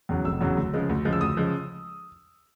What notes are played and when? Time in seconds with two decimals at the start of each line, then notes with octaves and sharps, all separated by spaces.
0.09 E2 C#3 F#3
0.25 F1 E6
0.41 E2 C#3 F#3
0.57 D2
0.74 C#3 F3 G#3
0.89 D2
1.05 C#3 F3 G#3
1.13 E6
1.21 D2 D#6
1.37 C#3 F3 G#3